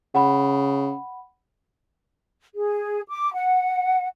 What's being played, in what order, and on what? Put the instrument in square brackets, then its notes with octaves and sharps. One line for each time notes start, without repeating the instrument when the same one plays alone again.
[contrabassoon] C#3 [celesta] F#5 B5
[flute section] G#4
D6
F#5